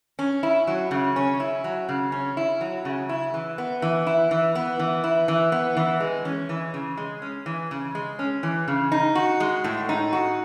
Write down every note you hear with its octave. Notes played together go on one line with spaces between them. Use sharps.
C#4
E4
F#3
C#3
C#4
E4
F#3
C#3
C#4
E4
F#3
C#3
E4
E3
B3
E3
E4
E3
B3
E3
E4
E3
B3
E3
G#3
C#4
E3
C#3
G#3
C#4
E3
C#3
G#3
C#4
E3
C#3
D#4
F#4
G#3
A2
D#4
F#4